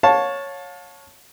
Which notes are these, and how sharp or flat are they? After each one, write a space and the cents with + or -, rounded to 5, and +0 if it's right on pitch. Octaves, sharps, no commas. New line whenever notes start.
C#5 +0 F5 +35 A5 +0